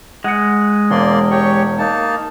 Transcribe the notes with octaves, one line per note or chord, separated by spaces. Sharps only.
G#3 F#5 C#7
E1 A#3 D5 C6
G4 C#5 C#6
A#3 D#4 A5